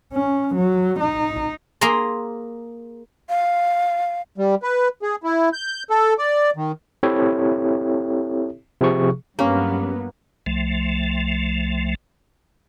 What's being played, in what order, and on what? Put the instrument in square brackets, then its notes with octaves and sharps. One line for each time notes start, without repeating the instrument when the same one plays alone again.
[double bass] C#4
F#3
D#4
[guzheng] A#3 G#4 G#5 A#5 C6
[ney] F5
[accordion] G3
B4
G#4
E4
G6
A4
D5
D#3
[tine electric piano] C4 E4 G4 A4 C#5 E5
C3 F3 G#4 C#6
[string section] G2 F#3 B3 [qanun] A#3 [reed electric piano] C#4 G4
[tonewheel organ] C2 F3 A3